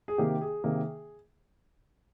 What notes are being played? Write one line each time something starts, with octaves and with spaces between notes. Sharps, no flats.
G#4
C3 D#3 A#3 G4
G#4
C3 D#3 A#3